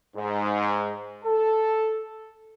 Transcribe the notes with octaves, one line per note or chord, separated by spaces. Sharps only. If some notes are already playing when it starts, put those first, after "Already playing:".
G#2
A4